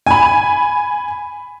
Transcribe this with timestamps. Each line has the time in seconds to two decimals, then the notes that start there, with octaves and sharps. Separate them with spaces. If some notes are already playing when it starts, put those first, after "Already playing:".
0.07 G#5 B5